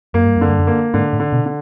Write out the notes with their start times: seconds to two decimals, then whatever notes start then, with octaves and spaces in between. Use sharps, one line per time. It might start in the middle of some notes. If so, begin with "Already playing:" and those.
0.14 F#2 A#3
0.26 G2
0.36 F#2
0.41 D3
0.48 G2
0.59 F#2
0.67 A#3
0.94 G#2 D3
1.13 A2
1.20 D3
1.32 B2
1.46 D3